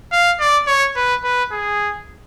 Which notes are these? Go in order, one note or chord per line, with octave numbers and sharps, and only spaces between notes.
F5
D5
C#5
B4
B4
G#4